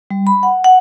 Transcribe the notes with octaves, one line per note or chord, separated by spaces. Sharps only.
G3
B5
F#5
F#5